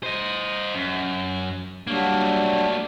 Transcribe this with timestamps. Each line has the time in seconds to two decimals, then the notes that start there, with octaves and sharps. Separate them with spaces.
0.03 C5 D#5
0.75 F#2
1.87 F#3 G3 A3 A#3 D4